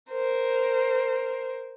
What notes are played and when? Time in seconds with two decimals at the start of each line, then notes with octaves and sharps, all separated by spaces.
0.12 A#4 C5